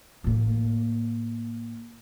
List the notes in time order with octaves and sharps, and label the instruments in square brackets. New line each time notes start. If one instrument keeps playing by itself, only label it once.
[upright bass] A2 A#3